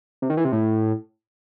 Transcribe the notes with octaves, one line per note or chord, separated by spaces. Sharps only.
C3
D#3
E3
C3
A2